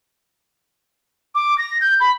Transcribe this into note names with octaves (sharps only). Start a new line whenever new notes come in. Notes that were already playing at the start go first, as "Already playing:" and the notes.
D6
A#6
G6
B5